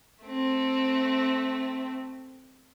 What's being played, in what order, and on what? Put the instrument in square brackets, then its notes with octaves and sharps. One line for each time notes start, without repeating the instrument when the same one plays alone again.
[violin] A3 C4